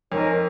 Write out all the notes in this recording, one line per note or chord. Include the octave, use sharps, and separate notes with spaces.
F2 D#4 A#4 C#5 G#5